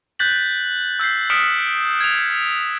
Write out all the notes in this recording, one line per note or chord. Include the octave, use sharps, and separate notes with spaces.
F#6 G6 A6 B6 F#7
E6 G6 B6 C7
D#6 F6 B6 C#7 D7 E7
G#6 F7